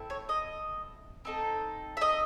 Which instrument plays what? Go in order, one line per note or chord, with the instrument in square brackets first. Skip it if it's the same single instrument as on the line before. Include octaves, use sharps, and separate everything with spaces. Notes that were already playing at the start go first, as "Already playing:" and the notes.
Already playing: [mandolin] C4 E4 A4
C#5
D#5
C4 D#4 A4
E5
D#5